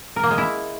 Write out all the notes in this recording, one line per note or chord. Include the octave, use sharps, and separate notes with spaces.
A#4
A#3
G#3
E4